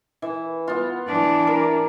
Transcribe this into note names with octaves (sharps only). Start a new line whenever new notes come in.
E3
B3 F4
E3 D4
A#4